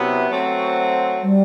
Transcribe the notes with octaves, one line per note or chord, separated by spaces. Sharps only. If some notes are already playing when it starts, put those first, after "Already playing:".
Already playing: C3 F#3 B3 E4
F#3 A3 C4 F#4
G3